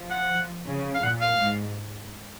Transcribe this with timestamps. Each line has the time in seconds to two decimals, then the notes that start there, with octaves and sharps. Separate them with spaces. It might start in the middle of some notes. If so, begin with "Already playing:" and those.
Already playing: F3
0.11 F#5
0.66 C#3
0.95 F5
1.03 A#2 F#5
1.21 F5
1.40 G#2